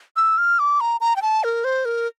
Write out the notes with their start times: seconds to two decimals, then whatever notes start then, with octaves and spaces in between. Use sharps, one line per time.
0.16 E6
0.38 F6
0.59 D6
0.81 A#5
1.01 A#5
1.16 G5
1.22 A5
1.44 A#4
1.64 C5
1.85 A#4